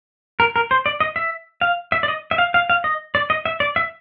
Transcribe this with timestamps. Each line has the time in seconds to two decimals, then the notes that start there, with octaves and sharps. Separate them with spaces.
0.40 A#4
0.56 A#4
0.71 C5
0.86 D5
1.00 D#5
1.16 E5
1.61 F5
1.92 E5
2.03 D5
2.08 D#5
2.31 E5
2.38 F5
2.54 F5
2.70 F5
2.84 D#5
3.15 D5
3.30 D#5
3.46 E5
3.60 D5
3.76 E5